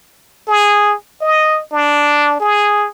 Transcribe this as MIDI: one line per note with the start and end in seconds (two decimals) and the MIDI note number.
0.48 0.95 68
1.21 1.61 75
1.73 2.39 62
2.40 2.88 68